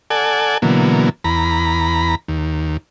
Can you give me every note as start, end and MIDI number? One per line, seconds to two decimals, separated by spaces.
0.10 0.58 69
0.10 0.58 74
0.10 0.58 78
0.10 0.58 80
0.62 1.09 47
0.62 1.09 50
0.62 1.09 52
0.62 1.09 54
0.62 1.09 58
1.24 2.15 40
1.24 2.15 82
1.24 2.15 83
2.28 2.77 39